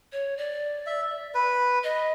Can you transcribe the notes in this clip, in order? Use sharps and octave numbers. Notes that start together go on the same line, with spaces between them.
C#5
D5
E5
B4
D#5